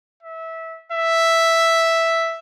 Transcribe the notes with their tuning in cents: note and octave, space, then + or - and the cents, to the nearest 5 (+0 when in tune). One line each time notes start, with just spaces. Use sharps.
E5 -20
E5 +0